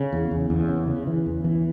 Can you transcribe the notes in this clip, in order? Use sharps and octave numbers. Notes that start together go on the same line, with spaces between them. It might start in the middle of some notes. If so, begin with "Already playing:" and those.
Already playing: C#3
E2
E2
E2
C#3
C#3
E3
E2
E3